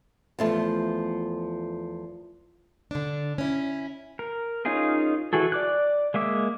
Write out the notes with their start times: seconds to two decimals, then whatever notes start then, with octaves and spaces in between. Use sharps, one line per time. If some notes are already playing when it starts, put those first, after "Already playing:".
0.39 E2 F3 A3
2.91 D3 D4
3.38 C#4 E4
4.19 A#4
4.65 C#4 D#4 F4 G#4 A#4
5.33 E3 F#4 G#4 A4
5.52 D5 D6 F#6
6.14 G#3 A#3 E5 D6